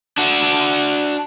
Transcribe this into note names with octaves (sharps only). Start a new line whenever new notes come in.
D4 F#4